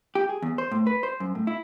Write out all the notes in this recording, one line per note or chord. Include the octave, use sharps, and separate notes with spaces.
G4
G#4
E2
C5
A2
B4
C5
F#2
A2
E4